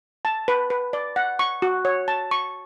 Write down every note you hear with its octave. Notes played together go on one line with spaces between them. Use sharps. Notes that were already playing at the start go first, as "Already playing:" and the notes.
A5
B4
B4
D5
F#5
C#6
F#4
C#5
A5
C#6